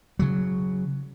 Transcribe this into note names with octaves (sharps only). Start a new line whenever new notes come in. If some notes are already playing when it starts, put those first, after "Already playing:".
C#3 F#3